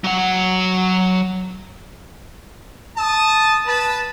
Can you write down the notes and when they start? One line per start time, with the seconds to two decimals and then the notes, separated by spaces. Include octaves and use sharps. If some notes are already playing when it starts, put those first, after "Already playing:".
0.04 F#3 F#5
2.97 A5 D#6
3.66 B4 A5